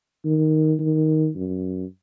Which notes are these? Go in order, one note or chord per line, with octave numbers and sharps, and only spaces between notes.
D#3
D#3
F#2